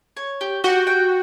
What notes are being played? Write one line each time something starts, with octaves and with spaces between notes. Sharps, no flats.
C#5
G4
F#4 G4
G5